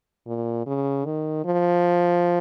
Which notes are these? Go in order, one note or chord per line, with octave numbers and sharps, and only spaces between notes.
A#2
C#3
D#3
F3